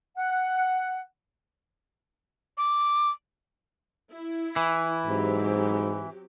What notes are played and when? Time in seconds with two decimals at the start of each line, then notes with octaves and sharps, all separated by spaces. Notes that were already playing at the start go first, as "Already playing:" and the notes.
0.17 F#5
2.58 D6
4.11 E4
4.56 E3
5.06 G#2 F#3 C4 G4